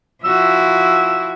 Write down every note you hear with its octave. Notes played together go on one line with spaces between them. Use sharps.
F3 E4 F#4 E6